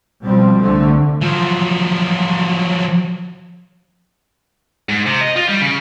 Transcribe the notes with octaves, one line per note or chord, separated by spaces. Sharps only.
B2 F3 G3 C4
C2 D3 A3
F3 F#3
G#2
C3
D#5
F4
G3
C#3